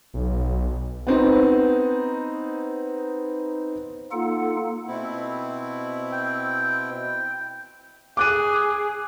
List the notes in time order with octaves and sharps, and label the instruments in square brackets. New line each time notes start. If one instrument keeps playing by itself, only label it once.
[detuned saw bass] B1
[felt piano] B3 C4 D#4
[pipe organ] A#3 D#4 F4 A4 F#5
[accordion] B2 C4 E4
[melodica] G5
[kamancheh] G#4 [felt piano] D6 F#6 D#7